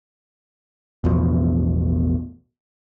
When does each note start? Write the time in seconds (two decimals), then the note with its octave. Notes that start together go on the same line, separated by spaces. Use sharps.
1.04 A1 E2 B2 F3